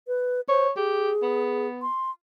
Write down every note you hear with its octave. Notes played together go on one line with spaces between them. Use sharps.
B4
C5 C#5
G4 G#4
B3
C6